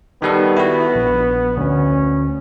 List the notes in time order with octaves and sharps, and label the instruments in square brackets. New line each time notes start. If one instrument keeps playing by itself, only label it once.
[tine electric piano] D#3 G3 A4 [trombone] B3
[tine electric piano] E4 F#4
A#1
[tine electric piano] D2 [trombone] C#4